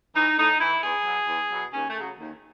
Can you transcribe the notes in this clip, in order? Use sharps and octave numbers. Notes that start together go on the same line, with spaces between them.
E3 D#4
A2 D#4
E3 E4
E2 G#4
B2 F#3
E2
B2 F#3
D#2 C#4
A3
C#3 F#3
D#2